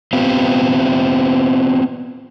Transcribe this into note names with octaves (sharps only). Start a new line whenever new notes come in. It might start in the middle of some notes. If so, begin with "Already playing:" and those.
B3 C4 F4 G4